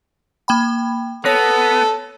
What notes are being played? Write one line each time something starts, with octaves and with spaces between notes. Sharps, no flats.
A#3 G5 B5
B3 A4 C#5 A#6